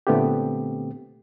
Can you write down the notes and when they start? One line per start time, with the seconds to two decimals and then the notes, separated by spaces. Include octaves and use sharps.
0.07 A#2 D3 A3 B3 C4 G4